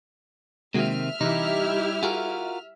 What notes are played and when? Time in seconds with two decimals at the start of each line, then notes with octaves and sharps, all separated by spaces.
0.74 C3 D#3 G#3 A#3 C4 F#4 E5 F6
1.21 C3 E3 G3 D#4 E4 G4
2.03 F4 F#4 G#4 A#4